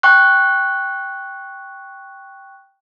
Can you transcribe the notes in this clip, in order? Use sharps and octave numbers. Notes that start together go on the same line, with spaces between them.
G5 C#6 F#6